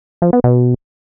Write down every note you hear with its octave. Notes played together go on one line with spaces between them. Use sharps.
F3
B3
B2